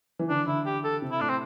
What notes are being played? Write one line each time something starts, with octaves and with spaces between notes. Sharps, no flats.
E3
D3 D4
D3 E4
G4
A4
C3
E4
A2 D4
C4